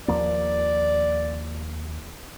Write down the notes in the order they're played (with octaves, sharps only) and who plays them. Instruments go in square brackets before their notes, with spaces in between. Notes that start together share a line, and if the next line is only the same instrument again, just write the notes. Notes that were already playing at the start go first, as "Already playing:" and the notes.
[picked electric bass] D#2 F3 A#3 [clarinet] D5